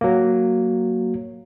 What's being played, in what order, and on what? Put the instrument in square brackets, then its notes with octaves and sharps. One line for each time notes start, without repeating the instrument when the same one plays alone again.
[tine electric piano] F#3 A#3